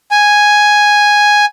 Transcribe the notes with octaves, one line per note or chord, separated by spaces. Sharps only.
G#5